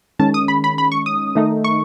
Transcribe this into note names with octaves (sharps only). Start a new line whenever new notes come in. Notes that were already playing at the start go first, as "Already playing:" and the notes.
D#3 G#3 C#4 A5
D#6
B5
B5
B5
C#6
D#6
D#3 A3 D#4
C#6